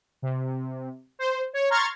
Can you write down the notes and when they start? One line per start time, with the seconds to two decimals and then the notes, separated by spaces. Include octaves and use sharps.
0.22 C3
1.19 C5
1.53 C#5
1.70 A#5 C6 C#6 F6 G#6 A6